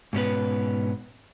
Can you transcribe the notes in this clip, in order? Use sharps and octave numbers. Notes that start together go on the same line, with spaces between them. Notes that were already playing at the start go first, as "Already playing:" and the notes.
G#2 B2 C#4 B4